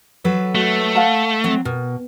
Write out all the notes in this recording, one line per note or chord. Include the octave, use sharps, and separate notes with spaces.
F#3 A4 B4
A3 F#4
F5 F#5 A5
F#3 C4
B2 A#4